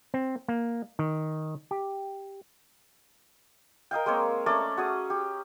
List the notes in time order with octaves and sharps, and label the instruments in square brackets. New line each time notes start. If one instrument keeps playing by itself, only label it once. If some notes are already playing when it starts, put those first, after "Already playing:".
[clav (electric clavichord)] C4
A#3
D#3
G4
[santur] A#4 D#5 F5 G5
G#3 A#3 C4 C#5
A3 C#4 D5 A#5
F#4 G#4 D#6
G4